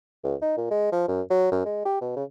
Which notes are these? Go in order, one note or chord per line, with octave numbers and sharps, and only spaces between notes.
C#2
D#4
A#2
G#3
F3
F#2
F#3
F#2
G#3
G4
B2
C#3